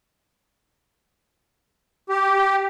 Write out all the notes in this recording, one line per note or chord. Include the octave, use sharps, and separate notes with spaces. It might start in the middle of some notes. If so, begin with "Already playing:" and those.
G4